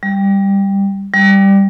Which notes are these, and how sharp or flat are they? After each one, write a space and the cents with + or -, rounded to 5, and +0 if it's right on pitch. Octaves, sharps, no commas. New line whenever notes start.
G3 +10
G3 +5